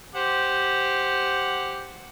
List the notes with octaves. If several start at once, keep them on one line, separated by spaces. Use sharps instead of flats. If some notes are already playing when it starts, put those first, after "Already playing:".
G4 C5 F#5